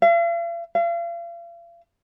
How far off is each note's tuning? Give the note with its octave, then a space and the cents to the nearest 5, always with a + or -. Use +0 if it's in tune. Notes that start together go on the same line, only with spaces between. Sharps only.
F5 -45
F5 -40